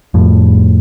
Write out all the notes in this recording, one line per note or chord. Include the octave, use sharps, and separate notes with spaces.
F2 A2